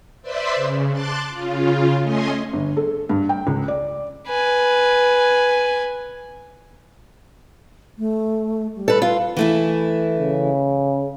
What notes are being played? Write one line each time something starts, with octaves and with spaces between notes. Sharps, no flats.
B4 C5 D5 E5 B5 C6
C#3
A5 C6 D6 F#6 A6
C#3 F4
A3 C#4 D#5 G#5 C6
G1
A4
G2
G5
C#2
D5
B4 G#5
A3
G3
A4 B4
F4
E3 A3 E4
C#3